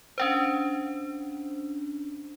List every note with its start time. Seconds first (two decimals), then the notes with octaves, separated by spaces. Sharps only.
0.18 C#4 D4 C5